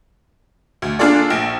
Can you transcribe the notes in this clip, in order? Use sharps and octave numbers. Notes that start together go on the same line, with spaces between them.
D2
A#3 D4 F4 G#4 A4 D5
A#1 D7